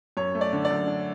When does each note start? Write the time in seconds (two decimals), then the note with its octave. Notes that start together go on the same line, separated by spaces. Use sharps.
0.17 F#2 C#5
0.35 A3
0.41 D5
0.53 D3
0.65 D5
0.71 F#2
0.87 D4